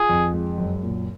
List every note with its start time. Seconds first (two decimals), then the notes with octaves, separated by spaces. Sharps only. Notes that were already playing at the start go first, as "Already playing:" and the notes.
Already playing: F4 G#4
0.09 F2
0.34 G#3
0.58 F#2
0.83 A#2